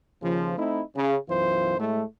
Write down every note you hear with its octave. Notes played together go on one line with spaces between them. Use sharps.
D#2 C#3 F3
A3 C4 D#4 E4
C#3
B1 F#2 E3 F4 C5
A2 G#3 A3